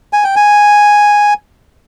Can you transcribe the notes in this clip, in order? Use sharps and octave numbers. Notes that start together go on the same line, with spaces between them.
G#5
G5
G#5